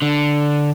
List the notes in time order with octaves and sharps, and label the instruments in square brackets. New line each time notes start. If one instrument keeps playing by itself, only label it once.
[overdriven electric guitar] D3